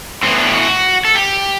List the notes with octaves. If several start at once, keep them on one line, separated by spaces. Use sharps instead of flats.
A2 E3 B3 C4
D4
G4
F#4
A4
G4